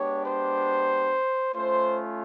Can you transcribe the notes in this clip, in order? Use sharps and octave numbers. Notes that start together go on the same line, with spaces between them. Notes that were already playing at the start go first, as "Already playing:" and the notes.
Already playing: G#3 B3 D4 G4 C#5
C5
A3 C#4 F4 C5